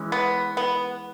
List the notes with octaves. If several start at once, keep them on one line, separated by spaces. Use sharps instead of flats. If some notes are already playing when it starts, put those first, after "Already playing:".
Already playing: E3 G#3 C#4
B3
B3